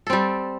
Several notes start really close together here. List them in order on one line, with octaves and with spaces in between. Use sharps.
A4 C4 G3